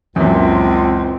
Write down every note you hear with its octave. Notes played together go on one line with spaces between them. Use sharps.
C#2 F#2 A#2 E3 C4